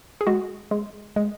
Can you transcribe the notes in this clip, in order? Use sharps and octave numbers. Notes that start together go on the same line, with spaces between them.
G#4
G#3 F#4
G#3
G#3